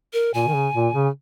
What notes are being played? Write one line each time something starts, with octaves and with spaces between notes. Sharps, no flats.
A#4
A#2 G#5
D#3
C#3
A#2
C#3